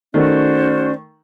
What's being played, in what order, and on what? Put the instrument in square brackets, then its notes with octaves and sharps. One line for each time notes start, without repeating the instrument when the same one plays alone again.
[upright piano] D#3 A3 [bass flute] C#4 [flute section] F#4 C5 D5